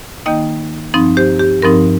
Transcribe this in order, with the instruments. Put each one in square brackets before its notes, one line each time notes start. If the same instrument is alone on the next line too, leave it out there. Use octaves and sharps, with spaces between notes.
[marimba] D#3 A#3 D#4 D#5 G5
G2 F3 C4 D#4
G4 C5
G4
G2 F3 C4 D#4 A#4